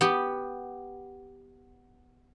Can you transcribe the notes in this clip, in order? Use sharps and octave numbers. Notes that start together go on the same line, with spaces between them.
B3 G4